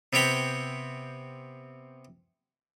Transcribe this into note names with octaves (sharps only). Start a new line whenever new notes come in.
C3 B3 C4 C#5 G5 B5